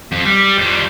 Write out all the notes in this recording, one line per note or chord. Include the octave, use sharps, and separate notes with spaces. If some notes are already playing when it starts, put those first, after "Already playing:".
F2
G3
F2 G3